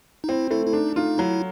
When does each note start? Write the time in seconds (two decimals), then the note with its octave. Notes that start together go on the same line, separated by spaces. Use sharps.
0.24 D#4
0.29 C4 E4
0.51 A3 E4
0.66 E4
0.73 D4 D#4
0.96 D#4 F4
1.18 F#3 E4